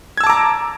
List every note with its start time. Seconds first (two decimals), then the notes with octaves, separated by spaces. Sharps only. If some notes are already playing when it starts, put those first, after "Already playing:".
0.17 G#6
0.21 E6
0.24 A5
0.27 D6
0.30 A#5